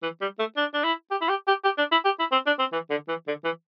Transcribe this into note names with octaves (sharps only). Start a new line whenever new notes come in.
E3
G3
A3
D4
D4
E4
G4
E4
G4
G4
G4
D4
E4
G4
E4
C4
D4
C4
E3
D3
E3
D3
E3